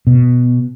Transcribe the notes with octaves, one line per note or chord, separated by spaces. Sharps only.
B2